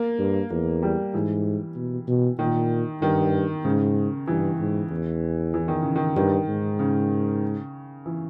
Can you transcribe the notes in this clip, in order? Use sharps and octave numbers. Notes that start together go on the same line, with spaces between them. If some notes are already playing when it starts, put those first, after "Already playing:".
Already playing: A#3
G2
E2 A#3
G3
G#2 E3
B2
B2
A#2 D#3
G2 D#3
G#2 C#3
G2 E3
G#2
E2
E3
D#3
C#3
D#3
G2 D#3
G#2
C#3
E3